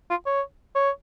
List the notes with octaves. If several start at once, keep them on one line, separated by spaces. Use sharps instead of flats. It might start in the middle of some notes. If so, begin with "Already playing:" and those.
F4
C#5
C#5